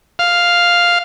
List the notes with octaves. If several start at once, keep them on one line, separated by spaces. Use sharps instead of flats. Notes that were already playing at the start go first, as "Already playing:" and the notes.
F5